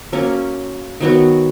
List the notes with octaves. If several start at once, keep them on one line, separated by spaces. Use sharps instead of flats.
F#3 A#3 C#4
D#3 F#3 B3 F#4